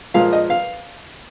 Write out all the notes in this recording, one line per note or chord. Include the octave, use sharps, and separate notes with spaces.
A#2 F3 G#3 F5
D#5
F5